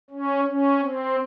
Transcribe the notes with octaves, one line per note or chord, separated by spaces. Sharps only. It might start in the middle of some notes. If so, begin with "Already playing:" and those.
C#4
C#4
C4